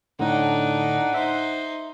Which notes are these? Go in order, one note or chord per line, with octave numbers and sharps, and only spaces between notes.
A2 D3 D4 D#4 F#5
D#4 C5 E5